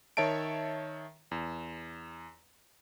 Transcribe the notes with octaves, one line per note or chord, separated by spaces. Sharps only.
D#3 C#5 E5 A5 D7
E2